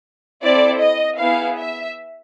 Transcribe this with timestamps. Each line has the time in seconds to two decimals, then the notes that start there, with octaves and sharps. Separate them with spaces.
0.44 C4 E4 A4 D5
0.82 D#5
1.20 B3 E4 G#4 F5
1.58 E5